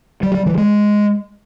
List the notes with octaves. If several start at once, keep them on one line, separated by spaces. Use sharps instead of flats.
G3
G3
E3
G#3